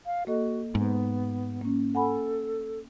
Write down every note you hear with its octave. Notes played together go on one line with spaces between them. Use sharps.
F5
A#3 F#4 A4 D#5
G#2 B3
A#3 C#4
A4 F#5 G#5 B5